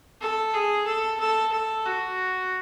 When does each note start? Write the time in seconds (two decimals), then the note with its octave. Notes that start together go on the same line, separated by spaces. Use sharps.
0.21 A4
0.54 G#4
0.87 A4
1.20 A4
1.52 A4
1.86 F#4